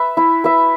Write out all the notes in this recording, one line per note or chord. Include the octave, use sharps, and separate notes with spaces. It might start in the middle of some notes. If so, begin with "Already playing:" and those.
Already playing: B4 E5
E4
B4 E5